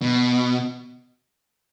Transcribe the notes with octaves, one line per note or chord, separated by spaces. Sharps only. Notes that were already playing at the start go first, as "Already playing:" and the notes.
B2